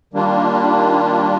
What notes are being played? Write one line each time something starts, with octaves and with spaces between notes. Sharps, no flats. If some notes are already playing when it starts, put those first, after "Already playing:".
D#3 G3 A#3 D4 F4